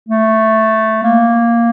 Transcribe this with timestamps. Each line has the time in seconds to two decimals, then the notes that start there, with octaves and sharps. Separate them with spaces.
0.08 A3
1.03 A#3